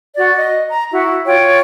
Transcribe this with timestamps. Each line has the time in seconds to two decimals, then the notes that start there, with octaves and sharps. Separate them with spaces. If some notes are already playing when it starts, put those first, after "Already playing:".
0.16 F#4 D5
0.36 D#5
0.68 A#5
0.92 E4 F#4
1.25 F4 C#5 G5